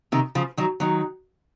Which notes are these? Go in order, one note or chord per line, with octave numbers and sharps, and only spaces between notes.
C3 D#3
C#3 F3
D#3 F#3
D#3 F#3